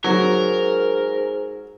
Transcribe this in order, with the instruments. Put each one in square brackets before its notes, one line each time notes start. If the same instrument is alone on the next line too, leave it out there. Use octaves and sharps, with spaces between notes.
[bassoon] G#2 [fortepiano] F#3 [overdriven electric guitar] A#4